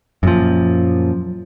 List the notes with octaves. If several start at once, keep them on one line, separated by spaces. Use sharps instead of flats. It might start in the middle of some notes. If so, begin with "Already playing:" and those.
F#2 A#2 F3